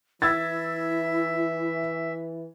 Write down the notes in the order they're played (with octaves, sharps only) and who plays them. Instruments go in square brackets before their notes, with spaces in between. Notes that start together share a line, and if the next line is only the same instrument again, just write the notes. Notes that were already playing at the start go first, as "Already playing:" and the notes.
[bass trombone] E3 [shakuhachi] E4 [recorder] E5 [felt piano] E6 G#6 A6